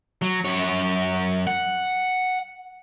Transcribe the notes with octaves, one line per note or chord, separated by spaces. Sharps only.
F#3
F#2 C#5
F#5